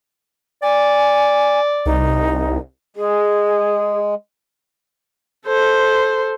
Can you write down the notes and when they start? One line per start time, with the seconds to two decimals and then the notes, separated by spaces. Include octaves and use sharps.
0.63 D5 G#5
1.86 C2 D#4
2.97 G#3 G#4
5.46 A4 C5